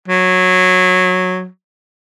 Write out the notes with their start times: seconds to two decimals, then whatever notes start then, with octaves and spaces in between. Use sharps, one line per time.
0.08 F#3